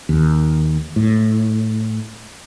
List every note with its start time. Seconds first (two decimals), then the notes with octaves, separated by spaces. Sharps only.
0.09 D#2
0.96 A2